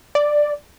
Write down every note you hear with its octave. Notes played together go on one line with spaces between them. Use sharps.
D5